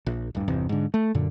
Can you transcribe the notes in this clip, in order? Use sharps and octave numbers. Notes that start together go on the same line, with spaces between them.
A#1
D1 G2
G1 E2 C3
G#2 D3
A3
F#2 A#2 D3